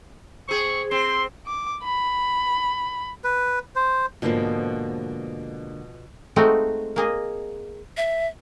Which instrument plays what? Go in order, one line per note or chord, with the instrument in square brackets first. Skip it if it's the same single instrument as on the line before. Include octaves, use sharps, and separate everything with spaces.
[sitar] C4 G#4 [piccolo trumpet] C#6
[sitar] C4 [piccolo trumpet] C6
[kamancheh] D6
B5
[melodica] B4
C5
[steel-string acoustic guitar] G#2 D3 A#3 [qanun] B2 F3
[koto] G#3 A3 C4 D#4 F4 F#4
A#3 G#4 D#5
[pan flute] E5